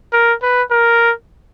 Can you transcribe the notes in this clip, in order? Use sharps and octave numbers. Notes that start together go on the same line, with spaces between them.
A#4
B4
A#4